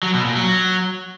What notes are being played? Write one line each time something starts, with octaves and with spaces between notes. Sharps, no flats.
F#3
B2
A#2
F#3